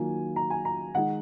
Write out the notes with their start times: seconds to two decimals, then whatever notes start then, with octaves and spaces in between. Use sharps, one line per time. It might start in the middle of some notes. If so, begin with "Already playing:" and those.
Already playing: D#3 F#3 A#3 F4 G#5
0.36 A#5
0.50 G#5
0.65 A#5
0.94 D#3 G#3 D#4 F#5